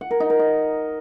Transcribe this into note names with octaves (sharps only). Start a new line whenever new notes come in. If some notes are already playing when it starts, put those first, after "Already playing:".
F#5
A#4
D#4
A#4
D#5